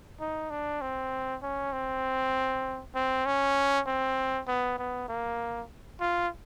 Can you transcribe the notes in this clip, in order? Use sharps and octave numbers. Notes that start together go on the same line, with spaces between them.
D#4
D4
C4
C#4
C4
C4
C#4
C4
B3
B3
A#3
F4